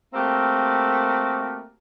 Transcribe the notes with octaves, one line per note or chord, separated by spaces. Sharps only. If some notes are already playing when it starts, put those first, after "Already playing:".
A3 A#3 C4 F#4 G4 A#4